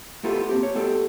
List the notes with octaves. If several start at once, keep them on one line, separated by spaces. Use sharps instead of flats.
A3 B3 F4 G4 A4
A#3 C4 G4
C#5
A3 B3 G4 A4